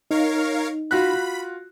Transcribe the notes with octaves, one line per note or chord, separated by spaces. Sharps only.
D#4 A#4 C#5 F5
F4 F#4 B5 F#6